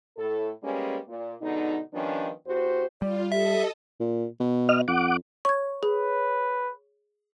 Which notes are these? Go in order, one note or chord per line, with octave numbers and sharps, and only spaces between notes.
A2 A4
G3 G#3 A#3 B3 C#4
A#2
B2 D3 G#3 D#4
D#3 F3 G3 B3 C#4 D4
E2 F#4 G4 C5
G3 F4 D5
G4 A4 D#5 E5
A#2
B2
D#5 F6
F2 F#5 D6
C#5 C#6 G#6
G#4 B4